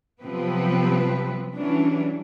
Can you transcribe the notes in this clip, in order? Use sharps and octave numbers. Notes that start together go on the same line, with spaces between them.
C3 F3 F#3 B3 C4 B4
E3 F#3 G3 C#4 D4